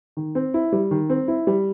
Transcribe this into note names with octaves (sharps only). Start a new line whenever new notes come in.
D#3
C4
E4
G3
D#3
C4
E4
G3